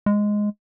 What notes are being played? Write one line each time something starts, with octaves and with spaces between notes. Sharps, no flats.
G#3